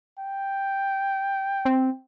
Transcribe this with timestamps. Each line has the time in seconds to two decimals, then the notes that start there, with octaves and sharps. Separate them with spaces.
0.19 G5
1.65 C4